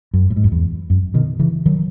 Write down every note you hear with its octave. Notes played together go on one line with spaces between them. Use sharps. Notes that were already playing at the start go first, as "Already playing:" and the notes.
F#2
A2
G#2
F#2
E2
F#2
B2 D#3
C#3 E3
D#3 F#3